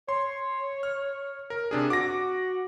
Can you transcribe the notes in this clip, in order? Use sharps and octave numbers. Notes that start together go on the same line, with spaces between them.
C#5 C6
F6
A#4
C3 D4 G#4
F#4 D6 A#6